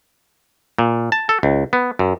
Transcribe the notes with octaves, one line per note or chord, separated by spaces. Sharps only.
A#2
A5
A4
C#2
B3
F#2